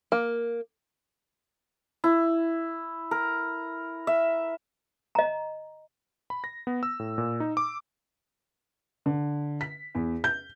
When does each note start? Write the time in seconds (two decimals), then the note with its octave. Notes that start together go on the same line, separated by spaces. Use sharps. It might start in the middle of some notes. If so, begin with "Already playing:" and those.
0.12 A#3
2.04 E4
3.11 A#4
4.07 E5
5.15 D#5 A#5
6.30 B5
6.44 A#6
6.67 B3
6.83 E6
7.00 A2
7.18 A#2
7.40 D#4
7.57 D6
9.06 D3
9.61 B6
9.95 E2
10.24 G6